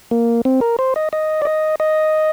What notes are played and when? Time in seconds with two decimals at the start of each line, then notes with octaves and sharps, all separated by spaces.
0.11 A#3
0.45 C4
0.61 A#4
0.79 C5
0.96 D#5
1.13 D#5
1.42 D5
1.45 D#5
1.80 D#5